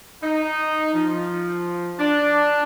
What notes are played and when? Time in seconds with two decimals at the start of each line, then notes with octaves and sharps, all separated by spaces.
0.23 D#4
0.94 F3
1.99 D4